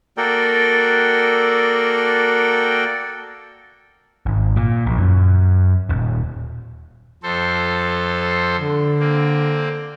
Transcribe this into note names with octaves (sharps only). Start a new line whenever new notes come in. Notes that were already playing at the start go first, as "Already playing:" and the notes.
A#3 F#4 A4 A#4 D5 G5
G#1
A#2
A#1
F#2
D#1
F2 A4 C5
D3
A#3 C4